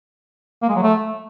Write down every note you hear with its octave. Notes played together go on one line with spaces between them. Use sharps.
A#3
G#3
F#3
A3